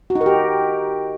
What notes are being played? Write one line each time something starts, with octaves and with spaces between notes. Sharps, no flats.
F#4
D#4
A#4
G4